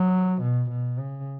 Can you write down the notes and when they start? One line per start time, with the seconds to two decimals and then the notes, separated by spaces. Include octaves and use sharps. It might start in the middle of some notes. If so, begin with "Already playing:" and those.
Already playing: F#3
0.42 B2
0.70 B2
0.99 C#3